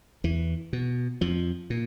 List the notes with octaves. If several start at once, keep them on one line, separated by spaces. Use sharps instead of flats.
E2 E3
B2
F2 F3
A#2